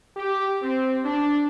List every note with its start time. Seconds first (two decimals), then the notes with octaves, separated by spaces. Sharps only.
0.17 G4
0.63 C4
1.04 D4